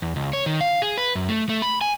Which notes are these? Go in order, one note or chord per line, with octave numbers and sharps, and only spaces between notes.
E2
C#2
C#5
D#3
F5
G#4
B4
F#2
A3
A3
B5
G#5